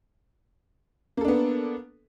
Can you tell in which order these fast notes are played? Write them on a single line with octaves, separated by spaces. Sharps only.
A#3 A4 D4 B3